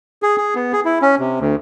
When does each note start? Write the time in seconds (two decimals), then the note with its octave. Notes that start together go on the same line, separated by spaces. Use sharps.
0.23 G#4
0.38 G#4
0.55 B3
0.73 G#4
0.85 E4
1.02 C#4
1.19 C3
1.40 D2